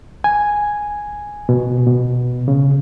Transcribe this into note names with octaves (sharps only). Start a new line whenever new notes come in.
G#5
B2
B2
C#3